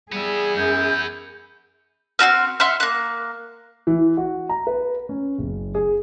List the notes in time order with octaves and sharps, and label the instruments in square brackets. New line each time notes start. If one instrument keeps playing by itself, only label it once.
[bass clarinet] G3 [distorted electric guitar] B3 E4 [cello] G#4
[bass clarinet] F#2 [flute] G6
[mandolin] C4 E4 F#4 F6
E5 F#5 C6 F6
A#3 F#6
[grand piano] E3
F#4
A#5
B4
C#4
F#1
G#4